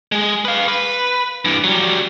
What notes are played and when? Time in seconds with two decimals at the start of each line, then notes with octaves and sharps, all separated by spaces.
0.12 G#3 G#4
0.45 B4 F5
0.68 B4
1.45 G2 E3
1.64 F#3 G3